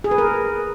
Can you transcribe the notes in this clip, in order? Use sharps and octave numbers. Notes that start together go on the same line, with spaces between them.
G#4
B4
A#4